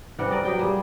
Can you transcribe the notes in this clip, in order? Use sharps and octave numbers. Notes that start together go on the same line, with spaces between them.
C3 E3 G3 F#5
A#4 D5 D#5
F#3 B3 G5
A#2 G3 G#4